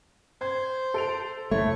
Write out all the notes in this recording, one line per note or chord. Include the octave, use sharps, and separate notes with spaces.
C5 G#6
A4 D7 F7
F1 A3 E4 C#5